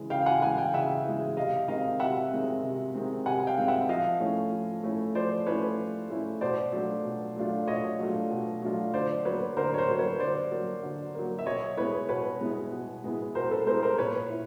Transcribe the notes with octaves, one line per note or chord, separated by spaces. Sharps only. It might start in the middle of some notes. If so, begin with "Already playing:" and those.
Already playing: C#3 E3 G#3
C#3 F5 G5
F#5 G#5
E3 G#3 F#5 G#5
F5 G5
C#3 E5 F#5
E3 G#3
C3 D#5 F5
D#3 G#3 C4 D#5 F5
C3 E5 F#5
D#3 G#3 C4
C3
D#3 G#3 C4
C3 F#5 G#5
F5 G5
D#3 G#3 C4
E5 F#5
F3 D#5 F5
A3 C#4 E4
F3
A3 C#4 E4
F3 C5 D5
A3 C#4 E4 B4 C#5
F3
A3 C#4 E4
B2 C5 D5
F#3 A3 D4 F4
B2
F#3 A3 D4 F4
B2 C#5 D#5
F#3 A3 D4 F4
B2
F#3 A3 D4 F4
D3 C5 D5
F#3 A#3 B4 C#5
D3 A#4 C5
C#5
A#4 C5
F#3 A#3
B4 C#5
D3 C5 D5
F#3 A#3
D3
F#3 A#3
E5
B2 C#5 D#5
G#3 B3 E4 B4 C#5
B2 B4 C#5
G#3 B3 E4
B2
G#3 B3 E4
B2 A#4 C5
A4 B4
G#3 B3 E4 A#4 C5
A#4 C5
A#2 B4 C#5
E4